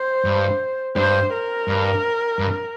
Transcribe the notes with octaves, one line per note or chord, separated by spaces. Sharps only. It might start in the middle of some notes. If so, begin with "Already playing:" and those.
Already playing: C5
G2
G2 C5
A#4
G2
G2